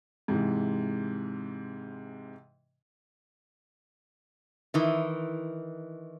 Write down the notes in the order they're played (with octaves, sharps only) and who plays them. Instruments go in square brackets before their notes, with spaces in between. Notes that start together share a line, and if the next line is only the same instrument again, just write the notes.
[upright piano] G#2 C3 E3 G#3
[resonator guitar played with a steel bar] D#3 E3